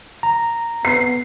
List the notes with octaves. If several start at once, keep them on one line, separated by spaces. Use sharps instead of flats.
A#5
B3 C7